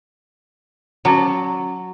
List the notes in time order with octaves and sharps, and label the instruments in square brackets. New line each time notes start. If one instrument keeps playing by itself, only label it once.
[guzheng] F#3 [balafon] C#4 F#4 A5